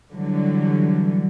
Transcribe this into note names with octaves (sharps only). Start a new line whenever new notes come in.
D3 E3 F#3 G3